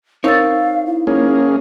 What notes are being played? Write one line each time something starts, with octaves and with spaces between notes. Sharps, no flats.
C4 D#4 A#4 C#5 F5 E6 A6
E4
A#3 C#4 G#4